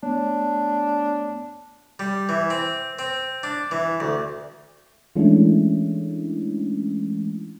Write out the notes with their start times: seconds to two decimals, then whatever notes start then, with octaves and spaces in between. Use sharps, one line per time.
0.03 A3 B3 D4 C#5
1.99 G3
2.29 E3
2.50 C4
2.99 C4
3.43 D4
3.71 E3
4.00 D2
5.16 E3 G#3 A3 C#4 D4 E4